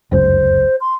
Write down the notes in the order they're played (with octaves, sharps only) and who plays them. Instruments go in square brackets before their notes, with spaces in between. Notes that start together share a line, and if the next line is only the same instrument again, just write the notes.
[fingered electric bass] F1 C#2 F#2 [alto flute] C5
[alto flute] C6